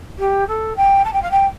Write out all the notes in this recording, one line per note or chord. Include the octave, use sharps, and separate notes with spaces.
G4
A4
G5
A5
G5
F5
G5